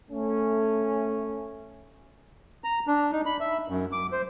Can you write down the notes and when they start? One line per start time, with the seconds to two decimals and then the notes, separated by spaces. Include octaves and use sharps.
0.11 A3 C#4
2.64 A#5
2.87 D4
3.12 D#4
3.26 B5
3.41 E5
3.68 F#2
3.92 D6
4.12 C5